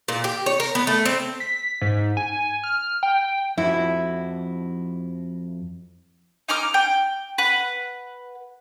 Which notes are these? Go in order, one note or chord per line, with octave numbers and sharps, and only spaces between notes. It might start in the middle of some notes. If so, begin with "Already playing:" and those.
A#2
G4
C#5
A#4
B3
A3
C4
B6
G#2
G#5
F6
G5
F2 E4 F#4
D#4 A#5 D6 F6
G5
B4 F#5